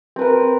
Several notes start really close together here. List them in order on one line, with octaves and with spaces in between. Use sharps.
C4 B4 A#4